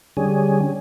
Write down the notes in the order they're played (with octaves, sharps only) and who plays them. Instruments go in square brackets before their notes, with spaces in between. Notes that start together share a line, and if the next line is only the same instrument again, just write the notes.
[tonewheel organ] D3 G3 C#4 G#4